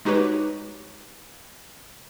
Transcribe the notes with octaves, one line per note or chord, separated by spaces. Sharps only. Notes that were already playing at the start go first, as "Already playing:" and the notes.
G#3 D#4 F#4 G4 B4 C#5